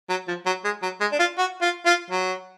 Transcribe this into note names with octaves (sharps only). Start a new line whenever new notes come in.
F#3
F3
F#3
G#3
F#3
G#3
D4
F4
F#4
F4
F4
F#3